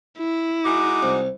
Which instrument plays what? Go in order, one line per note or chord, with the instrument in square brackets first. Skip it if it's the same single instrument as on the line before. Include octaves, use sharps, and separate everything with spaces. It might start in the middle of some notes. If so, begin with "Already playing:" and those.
[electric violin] E4
[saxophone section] G#3 D#4 F#4 [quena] D6
[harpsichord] C2